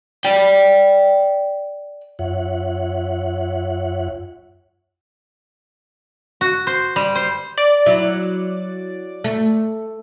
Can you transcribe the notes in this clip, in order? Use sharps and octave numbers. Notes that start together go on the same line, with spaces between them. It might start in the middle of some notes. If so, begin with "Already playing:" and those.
D5 G5
F#2 F4 C#5 E5 F#5 F#6
F#4
C5
G3
C5
D5
F#3 E4
A3